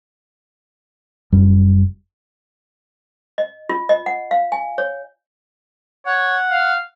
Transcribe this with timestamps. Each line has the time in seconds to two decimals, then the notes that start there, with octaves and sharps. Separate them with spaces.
1.32 F#1 F#2 G3
3.38 D#5
3.69 F4
3.89 D#5
4.06 F#5
4.31 F5
4.52 G#5
4.78 C#5
6.06 C#5 F#5
6.50 F5